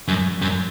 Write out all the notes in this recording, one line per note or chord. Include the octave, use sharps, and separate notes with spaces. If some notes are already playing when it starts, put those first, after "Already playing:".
F#2
F#2